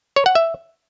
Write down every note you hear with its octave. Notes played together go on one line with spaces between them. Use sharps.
C#5
F#5
E5